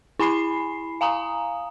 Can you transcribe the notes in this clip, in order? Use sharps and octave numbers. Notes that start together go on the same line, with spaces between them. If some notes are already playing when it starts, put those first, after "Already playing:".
E4 G#5 B5 C7
F5 G#5 A#5 D#6